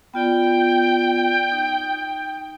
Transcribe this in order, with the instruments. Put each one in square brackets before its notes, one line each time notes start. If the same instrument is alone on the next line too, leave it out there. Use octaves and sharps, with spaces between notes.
[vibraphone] B3 F4 D5 [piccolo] G5
[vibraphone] D#4